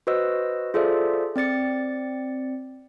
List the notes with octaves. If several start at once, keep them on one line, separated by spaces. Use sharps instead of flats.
F#4 B4 C5 D#5 E6
F4 G#4 A4 C5 D5 E5
C4 D5 A6 C#7